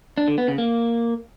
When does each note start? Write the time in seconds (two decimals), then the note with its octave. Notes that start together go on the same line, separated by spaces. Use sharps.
0.18 D4
0.28 D3
0.38 B3
0.48 C#3
0.58 A#3